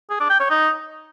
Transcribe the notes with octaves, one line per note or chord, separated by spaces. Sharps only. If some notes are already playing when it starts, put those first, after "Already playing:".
G#4
D4
G5
C#5
D#4